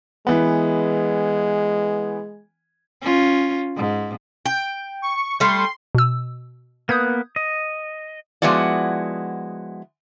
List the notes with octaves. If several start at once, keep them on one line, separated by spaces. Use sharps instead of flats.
E3 G#3 B3
C#4 F4
G#2
G5
C#6
G3 A3 C6
B2 E6
A#3 B3 B4 D#6 G6 G#6
D#5
F3 G#3 B3 E4 F#4 D5